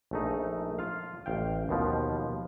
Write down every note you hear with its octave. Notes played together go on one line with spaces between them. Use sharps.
A#1 A3 D#4
F4 F5
A1 F5 G5
D#2 B2 F3